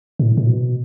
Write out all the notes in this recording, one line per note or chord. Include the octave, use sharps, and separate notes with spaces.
A2
A2
B2